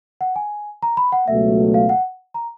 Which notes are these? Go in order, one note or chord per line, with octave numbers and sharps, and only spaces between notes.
F#5
G#5
A#5
B5
F#5
C#2 B2 F#3 A3 E5
F5
F#5
A#5